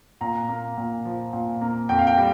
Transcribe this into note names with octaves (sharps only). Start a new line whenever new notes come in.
A#2 A#5
A#3
A#2
F3
A#2
A#3
F2 G5
F5
G5
G3